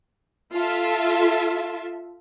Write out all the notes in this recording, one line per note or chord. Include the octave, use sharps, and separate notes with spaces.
F4 A4 E5